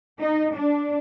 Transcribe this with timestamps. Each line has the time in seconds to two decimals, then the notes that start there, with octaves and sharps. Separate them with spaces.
0.20 D#4
0.55 D4